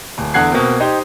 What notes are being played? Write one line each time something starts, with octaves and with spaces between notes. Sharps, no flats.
D1
E2 D3 F#5 F#6 G#6 C7
B2 A#3 C4
D#4 G4 C5